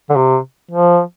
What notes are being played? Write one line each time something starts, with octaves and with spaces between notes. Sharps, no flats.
D3
C3
F3